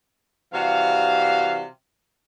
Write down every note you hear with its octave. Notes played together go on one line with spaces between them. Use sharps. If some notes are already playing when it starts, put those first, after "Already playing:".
C3 E3 G3 F#4 F5